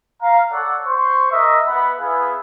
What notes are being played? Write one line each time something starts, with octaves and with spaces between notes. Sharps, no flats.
F5 A#5
A4 C#5 D5 F#5
C5 C6 C#6
A#4 D#5 E5
B3 B4 E5 F#5 B5
B3 E4 G#4 B4 E5 F5